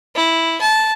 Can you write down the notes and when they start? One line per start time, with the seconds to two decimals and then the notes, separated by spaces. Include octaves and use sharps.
0.16 E4
0.61 A5